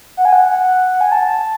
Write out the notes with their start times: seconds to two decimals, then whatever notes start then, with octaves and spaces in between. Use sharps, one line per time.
0.17 F#5
0.25 G#5
0.33 F#5
1.01 G#5
1.12 A5